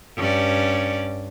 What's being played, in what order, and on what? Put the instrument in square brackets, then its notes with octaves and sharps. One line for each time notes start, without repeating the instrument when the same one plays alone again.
[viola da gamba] G2 C#4 D5